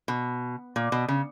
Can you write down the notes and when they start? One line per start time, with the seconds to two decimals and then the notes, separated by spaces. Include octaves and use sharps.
0.08 B2
0.76 A#2
0.92 B2
1.08 C#3